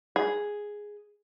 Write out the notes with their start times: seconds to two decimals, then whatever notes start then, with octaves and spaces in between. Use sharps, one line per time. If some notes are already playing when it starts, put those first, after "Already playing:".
0.16 G#4